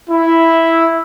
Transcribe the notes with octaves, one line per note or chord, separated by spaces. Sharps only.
E4